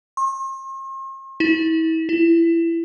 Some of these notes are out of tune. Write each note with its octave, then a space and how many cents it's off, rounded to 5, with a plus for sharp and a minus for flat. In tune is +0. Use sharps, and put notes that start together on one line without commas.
C6 +45
E4 -35
E4 +20